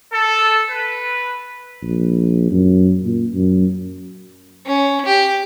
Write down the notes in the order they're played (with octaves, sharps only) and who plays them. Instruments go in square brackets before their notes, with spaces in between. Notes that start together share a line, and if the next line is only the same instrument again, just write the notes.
[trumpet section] A4
B4
[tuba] A#1
F#2
A#2
F#2
[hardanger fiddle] C#4
G4